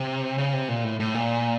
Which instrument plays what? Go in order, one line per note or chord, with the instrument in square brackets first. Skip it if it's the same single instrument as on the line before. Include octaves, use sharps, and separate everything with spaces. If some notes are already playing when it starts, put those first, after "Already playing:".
Already playing: [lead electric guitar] C3
C#3
C3
A#2
A2
A2
A#2